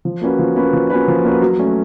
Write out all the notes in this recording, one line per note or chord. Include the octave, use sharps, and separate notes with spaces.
F3
A#3 C#4 F#4 B4
F3
A#3 C#4 F#4 B4
F3
A#3 C#4 F#4 B4
F3
A#3 C#4 F#4 B4
F#3
A3 C#4